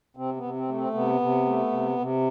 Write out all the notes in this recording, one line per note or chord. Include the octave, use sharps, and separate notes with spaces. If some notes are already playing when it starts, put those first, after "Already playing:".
C3 C4
B3
C3
C4
A3
C4
C3 B3
C3
A3
C3
C3